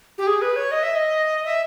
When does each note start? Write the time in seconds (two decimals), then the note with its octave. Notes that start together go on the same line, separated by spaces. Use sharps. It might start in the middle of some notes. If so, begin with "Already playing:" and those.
0.18 G4
0.27 G#4
0.42 B4
0.56 C#5
0.71 D#5
0.83 E5
0.95 D#5
1.45 E5